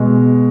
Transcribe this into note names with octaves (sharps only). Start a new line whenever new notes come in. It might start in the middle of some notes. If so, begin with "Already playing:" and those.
Already playing: B2 G#3